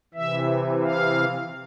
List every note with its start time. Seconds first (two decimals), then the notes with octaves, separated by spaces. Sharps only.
0.14 C3 E3 E5
0.83 F5